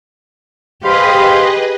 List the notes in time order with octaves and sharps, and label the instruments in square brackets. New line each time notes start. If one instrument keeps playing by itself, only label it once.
[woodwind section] G#2 F5 B5 [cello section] G4 [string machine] G#4 B4 D#5 [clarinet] C6